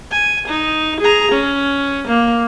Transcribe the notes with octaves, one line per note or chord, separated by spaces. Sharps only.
G#5
D#4
G#4 A#5
C#4
A#3